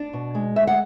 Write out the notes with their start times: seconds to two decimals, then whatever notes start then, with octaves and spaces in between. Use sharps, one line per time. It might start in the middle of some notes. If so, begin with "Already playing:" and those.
Already playing: D4 D5
0.13 B2
0.35 G#3
0.56 D2 E5
0.67 F#5